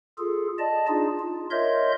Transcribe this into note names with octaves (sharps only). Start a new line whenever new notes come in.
F4 G#4 A4
D5 D#5 A5
D4 D#4 F4 G#4
F4
A#4 C#5 D#5 E5 C6 G6